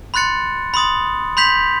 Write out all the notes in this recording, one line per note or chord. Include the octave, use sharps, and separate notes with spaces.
B5 C6 F#6 A6 C#7
B5 C6 D#6 A6
B5 C6 G6 B6 F7